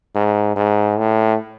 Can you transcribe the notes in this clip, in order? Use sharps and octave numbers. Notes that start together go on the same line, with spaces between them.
G#2
G#2
A2